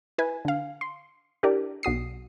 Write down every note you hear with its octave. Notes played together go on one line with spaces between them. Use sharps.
E4 B4 G#5
D3 F5
C6
D4 E4 G4 A#4 D5
B1 F#4 D#6 C7